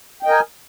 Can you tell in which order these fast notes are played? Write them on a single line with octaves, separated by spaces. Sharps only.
G5 D#5 A#4 G#5